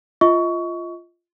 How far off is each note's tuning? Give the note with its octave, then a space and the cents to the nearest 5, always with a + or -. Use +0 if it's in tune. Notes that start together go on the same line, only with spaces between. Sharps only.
F4 -10 D#5 +30 C#6 +20